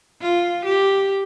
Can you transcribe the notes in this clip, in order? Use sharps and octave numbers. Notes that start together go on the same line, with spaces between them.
F4
G4